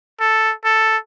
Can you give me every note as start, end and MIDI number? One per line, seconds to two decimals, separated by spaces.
0.20 0.53 69
0.65 0.97 69